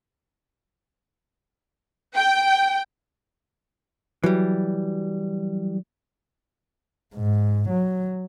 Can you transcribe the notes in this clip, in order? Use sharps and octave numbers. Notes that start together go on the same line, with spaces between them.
G5
E3 F#3 G3
G#2
F#3